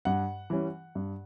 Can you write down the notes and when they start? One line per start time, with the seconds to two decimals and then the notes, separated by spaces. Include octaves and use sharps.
0.05 G2 F#5
0.50 E3 G3 C#4
0.95 G2